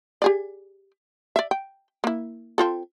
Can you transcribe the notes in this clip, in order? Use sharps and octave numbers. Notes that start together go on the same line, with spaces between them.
G4 G#4 D5
D5 E5
G5
A#3 E4
C4 F4 A4